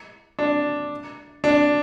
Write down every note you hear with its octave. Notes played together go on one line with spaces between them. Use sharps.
D4
D4